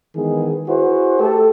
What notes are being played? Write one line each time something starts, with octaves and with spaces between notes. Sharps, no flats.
D#3 E3 G#3 B3 G#4
E4 F#4 G#4 B4 C5
A3 G4 A4